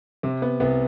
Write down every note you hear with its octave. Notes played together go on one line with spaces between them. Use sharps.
C3 C4
B3
C2 B3